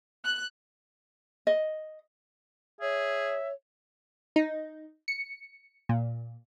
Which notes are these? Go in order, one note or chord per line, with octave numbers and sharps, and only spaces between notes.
F#6
D#5
G#4 C#5 E5
D#4
C#7
A#2